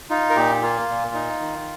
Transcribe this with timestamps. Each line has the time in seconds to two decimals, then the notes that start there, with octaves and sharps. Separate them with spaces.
0.10 D#4 F4
0.30 A#4
0.36 A#2 G4
0.62 A#3 F4
0.89 A#2
1.14 D#4
1.40 D#3